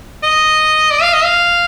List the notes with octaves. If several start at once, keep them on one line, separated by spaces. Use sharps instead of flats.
D#5
D5
F5
D#5
F5